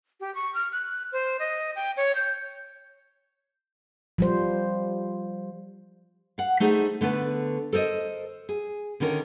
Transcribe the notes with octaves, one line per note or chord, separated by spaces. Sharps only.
G4
C#6
F6
F#6
C5
D#5
G5
C#5
G6
F3 G3 C5
F5 F#5
A3 D#4 G#4 C5
D3 A3 B3 B4
A4 A#4 C5 D#5
G#4
D3 D#3 C#4 A#4